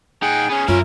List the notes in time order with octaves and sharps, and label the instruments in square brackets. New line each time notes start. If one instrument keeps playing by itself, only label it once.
[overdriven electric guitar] D#4 F#5 [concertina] G#4 G5
[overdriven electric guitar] B3 C#4 [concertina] G#4
[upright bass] F#2 [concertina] C#4 [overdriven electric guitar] E4 A#4 [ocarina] F4